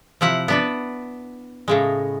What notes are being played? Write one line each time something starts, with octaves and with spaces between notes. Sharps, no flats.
C3 F3 E4 F#5
B3 D4 B4
A2 C#3 G#3